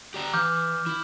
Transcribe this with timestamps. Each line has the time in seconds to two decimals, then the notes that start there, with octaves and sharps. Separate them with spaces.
0.14 G4 D5 A#5
0.33 E3 D6 F6 G6
0.86 E4